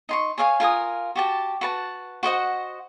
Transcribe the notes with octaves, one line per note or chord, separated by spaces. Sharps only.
D#4 C6 C#6
G#4 C#5 F5 G#5
F4 A#4 G#5 D#6
F#4 G4 A5
F#4 B4 A5
F#4 C5 D#5 F#5